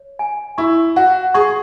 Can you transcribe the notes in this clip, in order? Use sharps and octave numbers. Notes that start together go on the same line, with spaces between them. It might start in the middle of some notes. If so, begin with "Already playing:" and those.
Already playing: C#5
G#5
E4 C#6
F#4 F#5
G#4 C#6